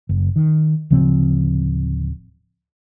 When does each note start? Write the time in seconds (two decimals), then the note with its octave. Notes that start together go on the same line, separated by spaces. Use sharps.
0.09 F#1
0.36 D#3
0.90 D1 C#3 F3 C4